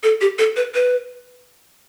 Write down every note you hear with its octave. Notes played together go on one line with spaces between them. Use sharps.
A4
G4
A4
B4
B4